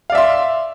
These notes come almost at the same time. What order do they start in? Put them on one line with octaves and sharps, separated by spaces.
F5 D5 E5 C6